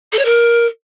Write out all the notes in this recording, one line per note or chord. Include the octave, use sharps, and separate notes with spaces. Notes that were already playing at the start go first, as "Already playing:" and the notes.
A4
C#5
A#4